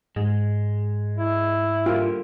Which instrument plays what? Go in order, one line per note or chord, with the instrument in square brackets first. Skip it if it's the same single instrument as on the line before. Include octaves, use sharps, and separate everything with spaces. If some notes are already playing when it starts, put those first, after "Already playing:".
[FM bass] G#2 [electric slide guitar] G#3
[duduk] E4
[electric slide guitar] D3 G3 A#3 [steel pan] F4